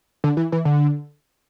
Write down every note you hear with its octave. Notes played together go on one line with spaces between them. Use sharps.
D3
E3
E3
D3